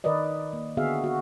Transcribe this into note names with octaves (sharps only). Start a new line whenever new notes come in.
D#3 A#4 B4 D5 D#5
A#3
D3 B3 F#4 G#4 E5 F5
F#4